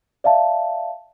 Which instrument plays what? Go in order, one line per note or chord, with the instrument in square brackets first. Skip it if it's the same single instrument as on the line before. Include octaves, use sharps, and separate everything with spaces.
[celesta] D5 E5 F5 A5